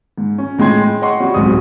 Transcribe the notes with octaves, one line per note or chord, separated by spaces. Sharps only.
G#2
C#4
A2 G#3 G5 C6 G#6
C#5 D#5 F#5 C6 C#6
G3 F#4 C#6
D1 B1 G#2 C4 D#6